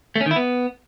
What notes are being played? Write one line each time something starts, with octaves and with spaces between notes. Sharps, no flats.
A3
C#4
D#3
E4
B3